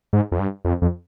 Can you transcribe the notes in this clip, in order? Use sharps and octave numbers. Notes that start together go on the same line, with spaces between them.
G#2
F2
G2
F2
F2